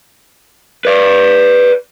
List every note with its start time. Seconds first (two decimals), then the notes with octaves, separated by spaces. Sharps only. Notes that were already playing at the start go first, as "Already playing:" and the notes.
0.85 B4 D5